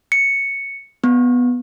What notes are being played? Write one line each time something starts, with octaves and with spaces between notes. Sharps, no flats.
C#7
B3